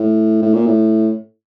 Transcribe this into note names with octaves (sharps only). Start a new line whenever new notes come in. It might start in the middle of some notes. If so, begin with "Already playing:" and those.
Already playing: A2
A2
A#2
A2